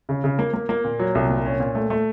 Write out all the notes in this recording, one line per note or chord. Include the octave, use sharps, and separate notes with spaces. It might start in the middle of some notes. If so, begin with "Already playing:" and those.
C#3
C#3
A#3
A#3
A#3
A#2
F#3
C2
A#2
C#4
A#2
A3
A3